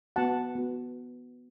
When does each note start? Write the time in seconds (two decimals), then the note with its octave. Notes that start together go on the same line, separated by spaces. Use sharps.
0.16 B3 F#4 F#5 A5
0.55 B3 F#4